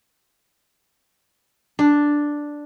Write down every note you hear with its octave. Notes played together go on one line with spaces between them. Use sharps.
D4